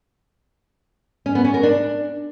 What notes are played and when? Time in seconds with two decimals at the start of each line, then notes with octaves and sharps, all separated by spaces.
1.26 C#4
1.35 B3
1.45 C#4
1.54 A#4
1.63 D4